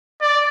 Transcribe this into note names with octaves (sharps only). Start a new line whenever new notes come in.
D5